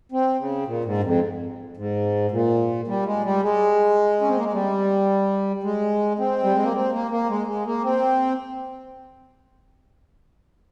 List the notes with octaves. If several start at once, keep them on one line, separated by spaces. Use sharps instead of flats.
C4
C#3
A#2
G#2
G2
F2
G#2
A#2
G3
G#3
G3
G#3
C#4
C4
A#3
G#3
G3
G#3
C4
G3
G#3
A#3
C4
A#3
A#3
G#3
G#3
A#3
C4